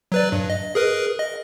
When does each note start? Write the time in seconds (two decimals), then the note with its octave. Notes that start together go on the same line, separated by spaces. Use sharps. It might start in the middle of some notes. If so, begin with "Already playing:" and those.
0.12 F#3 B4 D5
0.32 G2
0.50 D#5
0.75 G#4 A#4 B4
1.19 D#5